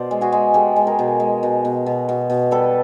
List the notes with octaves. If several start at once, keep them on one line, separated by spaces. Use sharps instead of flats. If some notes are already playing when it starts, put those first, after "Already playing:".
Already playing: B2 C5 D5
G#3
F#4 G#4
G#3
G#3 G4 A4
G#3
G#4 A#4
B2
G#3
B2
B2
B2
B2
B2
G3 A4 B4